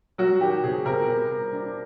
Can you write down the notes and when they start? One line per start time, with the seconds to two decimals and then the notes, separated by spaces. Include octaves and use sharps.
0.18 F#3 F#4
0.41 D#3 G4
0.63 C3 G#4
0.85 C3 A#4
1.08 B3
1.30 G3
1.53 D4